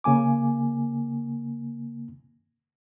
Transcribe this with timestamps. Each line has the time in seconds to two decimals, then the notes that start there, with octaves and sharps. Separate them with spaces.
0.04 C#3 A#3 G#5 D6